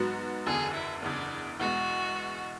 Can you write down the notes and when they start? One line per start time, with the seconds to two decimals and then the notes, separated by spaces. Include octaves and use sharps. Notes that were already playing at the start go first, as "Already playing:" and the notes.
Already playing: G#2 F#3 B3 F#4
0.46 F#1 E2 D3 G#4
0.74 E4
1.02 F#1 E2 C#3 D4
1.59 E2 B2 G#3 F#4